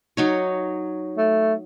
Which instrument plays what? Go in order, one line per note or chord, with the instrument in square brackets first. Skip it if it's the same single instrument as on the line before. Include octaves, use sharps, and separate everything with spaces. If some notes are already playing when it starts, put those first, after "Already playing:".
[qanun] F#3 D#4 C#5
[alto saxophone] A3